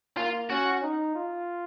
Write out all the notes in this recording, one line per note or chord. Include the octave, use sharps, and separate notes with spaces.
A#3 F4
C#4 F#4
D#4
F4